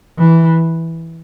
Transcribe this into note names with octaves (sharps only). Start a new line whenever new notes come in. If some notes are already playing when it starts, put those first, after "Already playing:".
E3